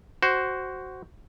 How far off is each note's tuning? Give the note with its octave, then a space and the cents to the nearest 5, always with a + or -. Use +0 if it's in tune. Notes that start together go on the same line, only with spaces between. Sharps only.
F#4 +10 C5 +0